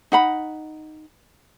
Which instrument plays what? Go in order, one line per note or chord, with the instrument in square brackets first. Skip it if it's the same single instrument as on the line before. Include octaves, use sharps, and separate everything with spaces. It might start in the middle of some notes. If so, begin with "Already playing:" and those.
[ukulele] D#4 F#5 B5